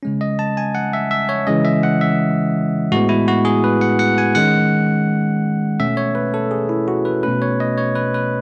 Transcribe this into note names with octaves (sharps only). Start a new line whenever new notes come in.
C#3 G#3 C#4
D#5
A5
G#5
F#5
E5
E5
C#5
C#3 E3 G#3 C#4 D#5
E5
F#5
E5
A2 G#3 B3 F#4
E4
F#4
G#4
B4
F#5
F#5
G#5
D#3 G#3 C#4 F#5
B2 A3 C#4 E5
C#5
B4
A4
G#4
E4
F#4
B4
B2 A3 C#4 B4
C#5
D#5
C#5
B4
B4